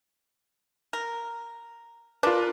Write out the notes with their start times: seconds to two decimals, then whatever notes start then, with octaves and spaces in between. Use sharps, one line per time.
0.93 A#4
2.23 D4 F4 A#4 B4